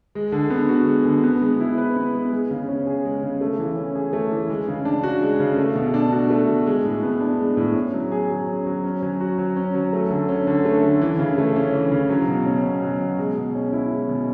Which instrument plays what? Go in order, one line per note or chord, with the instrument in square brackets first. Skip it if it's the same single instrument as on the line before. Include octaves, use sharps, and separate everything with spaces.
[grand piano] G#3
D3
B3
F#4
G#3
D3
B3
G#3
E4
B4
B3
G#3
G#3
C#3
C#4
G#4
G#3
C#3
A3
E3
C#4
G#4
A3
E3
G#3
C#3
D4
F#4
G#3
C#3
A3
B2
D4
F#4
A3
B2
G#3
A2
B3
D4
G#3
A2
C#4
F#3
G#4
F#3
C#4
F#3
C#4
F#3
F#4
F#3
C#4
F#3
A3
D3
C#4
D3
A3
D3
E3
C#3
A3
C#4
E3
C#3
F#3
B2
C#4
B2
F#3
B2
G#3
B2
C#4
E4
G#3
B2